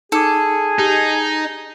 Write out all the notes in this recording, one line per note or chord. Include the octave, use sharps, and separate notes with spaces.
D#4 G#4 A4 D6
D#4 G4